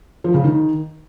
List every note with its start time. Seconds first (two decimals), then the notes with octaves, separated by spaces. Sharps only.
0.24 F3
0.34 C#3
0.44 D#3